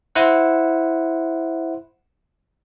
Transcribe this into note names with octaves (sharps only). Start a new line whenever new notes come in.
E4 C5 F#5